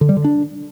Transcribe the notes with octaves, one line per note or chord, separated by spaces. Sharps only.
D3
G3
D3
D4